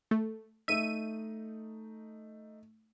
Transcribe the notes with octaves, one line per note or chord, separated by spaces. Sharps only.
A3
A3 D#4 E5 D#7